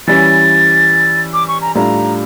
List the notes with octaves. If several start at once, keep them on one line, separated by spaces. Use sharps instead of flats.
E3 G3 C#4 A6
D6
C#6
A#5
A2 G3 D4 F4 A#5